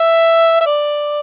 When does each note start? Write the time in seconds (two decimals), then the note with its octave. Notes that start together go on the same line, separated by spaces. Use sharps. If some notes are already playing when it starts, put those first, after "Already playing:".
Already playing: E5
0.61 E5
0.66 D5